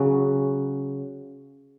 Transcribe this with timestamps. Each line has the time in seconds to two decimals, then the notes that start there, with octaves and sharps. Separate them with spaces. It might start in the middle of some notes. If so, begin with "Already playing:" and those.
Already playing: C#3 F#3